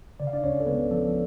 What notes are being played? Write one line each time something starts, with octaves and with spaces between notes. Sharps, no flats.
C#3 D5
F5
D4 D5
C#2 C#4 C#5
A4
C#2 B3 B4
F3 A4